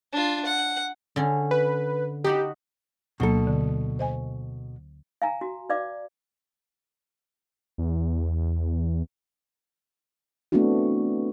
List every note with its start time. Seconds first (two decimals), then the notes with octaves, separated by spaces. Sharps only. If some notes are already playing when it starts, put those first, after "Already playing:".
0.12 D4 F4
0.46 F#5
1.16 D3 C#4
1.51 B4
2.24 D#4 F#4 G4 B5
3.20 D2 B2 F#3 A#3 A4
3.47 D3
3.99 C5 D#5 G#5
5.22 F5 G#5 A#5
5.41 F#4
5.69 B4 D5 F5 D6
7.78 E2
10.52 A3 B3 C4 D4 E4 F#4